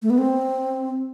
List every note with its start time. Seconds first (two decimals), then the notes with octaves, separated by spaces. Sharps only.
0.02 A3
0.10 B3
0.18 C4